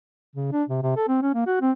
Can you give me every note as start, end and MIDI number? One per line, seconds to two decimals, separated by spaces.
0.35 0.48 49
0.52 0.63 62
0.69 0.81 48
0.83 0.92 48
0.96 1.06 69
1.08 1.17 60
1.22 1.32 61
1.34 1.45 58
1.47 1.60 66
1.61 1.71 60